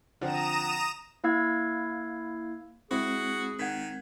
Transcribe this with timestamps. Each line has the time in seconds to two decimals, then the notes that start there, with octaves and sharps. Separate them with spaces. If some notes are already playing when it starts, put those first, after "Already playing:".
0.21 D3 F3 C4 A#5 D#6 E7
1.24 A#3 E4 F5 E6 G#6
2.91 G#3 C4 E4 F#4 G#4
3.59 D#3 F#5 G#6 B6